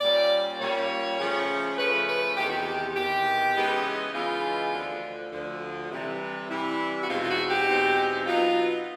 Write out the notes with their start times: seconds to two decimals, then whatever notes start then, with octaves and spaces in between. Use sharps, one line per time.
0.01 A#2 G3 A#3 C#4 D5
0.60 A#2 G3 A#3 C#4 C#5
1.19 C#3 F3 A3 C#4
1.78 C#3 F3 A3 C#4 B4
2.08 B4
2.37 E2 C3 D#3 G4
2.49 F#4
2.61 G4
2.96 E2 C3 D#3 G4
3.55 C#3 E3 G#3 B3 D#4
4.13 C#3 E3 G#3 B3 D#4 F4
4.73 D2 D3 F3
5.32 D2 D3 F3
5.91 C3 E3 G3
6.50 C3 E3 G3 E4
7.02 F#4
7.08 E2 B2 G#3 C4 D#4 F4
7.22 F4
7.28 F#4
7.48 G4
7.68 E2 B2 G#3 C4 D#4
8.26 B2 F#3 B3 D#4 F4